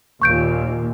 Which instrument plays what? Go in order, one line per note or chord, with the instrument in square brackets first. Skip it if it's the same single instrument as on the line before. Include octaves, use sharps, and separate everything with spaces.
[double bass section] D#2 A#2 [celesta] C#6 G6 D7